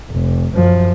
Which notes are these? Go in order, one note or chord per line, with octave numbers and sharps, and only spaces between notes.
F1
F#2 F3